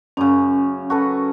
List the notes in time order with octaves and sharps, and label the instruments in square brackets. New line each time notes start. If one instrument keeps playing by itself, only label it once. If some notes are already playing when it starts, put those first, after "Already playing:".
[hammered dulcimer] F#2 C#3 [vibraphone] C#4
[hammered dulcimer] F#4 A4 B4